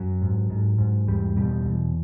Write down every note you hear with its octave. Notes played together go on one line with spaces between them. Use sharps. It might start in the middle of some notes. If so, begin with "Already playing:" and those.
Already playing: F#2 F#3
G#2
G#2
G#2
E2 G3
B2 G3
E2